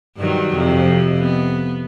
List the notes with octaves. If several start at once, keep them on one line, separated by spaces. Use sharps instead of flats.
G2 D#3 F#3
F2 C3
B3